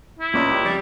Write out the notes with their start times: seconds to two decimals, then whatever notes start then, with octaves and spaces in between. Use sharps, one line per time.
0.19 E4
0.34 C#2 A#2 C#4 D5
0.51 G4
0.65 F2 G3 D5